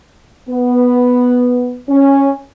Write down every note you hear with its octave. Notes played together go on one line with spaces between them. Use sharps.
B3
C#4